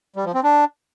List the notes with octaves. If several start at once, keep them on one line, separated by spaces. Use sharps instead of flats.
G3
F3
C4
D4